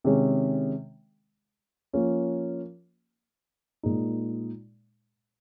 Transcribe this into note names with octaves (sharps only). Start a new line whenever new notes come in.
C3 D#3 G#3 C#4 G#4
F3 A#3 C#4 F4
A#2 G#3 D#4